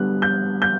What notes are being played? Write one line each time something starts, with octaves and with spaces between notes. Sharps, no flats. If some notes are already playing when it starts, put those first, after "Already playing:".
Already playing: D3 G3 B3 F#6
G6
G6